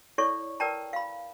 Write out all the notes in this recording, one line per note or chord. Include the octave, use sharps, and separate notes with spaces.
E4 A4 C#5 D5 C#6
A#4 B4 D5 G5 A5 A#5
F5 B5